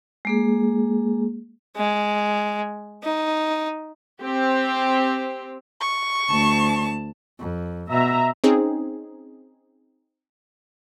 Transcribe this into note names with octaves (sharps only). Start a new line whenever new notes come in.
G#3 A#3 G#4
G#3
D#4
C4 G4
C#6
D2 A5
F2
B2 E5 A#5
C4 C#4 D#4 G#4